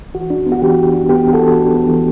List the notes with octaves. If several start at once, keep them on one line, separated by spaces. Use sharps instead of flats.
E3 F#4
D4
B3
F#4
E3 G4
E3
D4
B3 G4
E3
F#4 A4
E3
D4
B3
E3